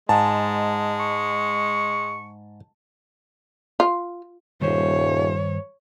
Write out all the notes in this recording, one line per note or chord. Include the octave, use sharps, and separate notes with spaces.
G#2 G#3 A5
C#6
F4
D#1 G2 D#3 C5 C#5